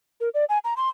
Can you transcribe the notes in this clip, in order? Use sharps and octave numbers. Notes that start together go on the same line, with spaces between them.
A#4
D5
G#5
A#5
C6